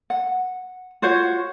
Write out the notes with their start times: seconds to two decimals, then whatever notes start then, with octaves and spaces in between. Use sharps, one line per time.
0.10 F#5
1.02 F4 F#4 C5 C#5